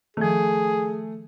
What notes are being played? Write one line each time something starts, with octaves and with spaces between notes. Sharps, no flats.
D#3 F3 A3 G#4